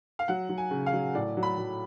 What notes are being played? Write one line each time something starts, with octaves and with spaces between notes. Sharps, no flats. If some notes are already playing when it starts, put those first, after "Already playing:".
F5
F#3 F#5
F#3
G#5
C#3
F5
F#3
A2 D5
F#3
B5
F#3